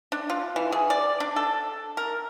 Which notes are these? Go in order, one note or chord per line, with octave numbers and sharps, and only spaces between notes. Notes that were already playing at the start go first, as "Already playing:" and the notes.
D4
F4
E3
G#4
D5
D4
A4
A#4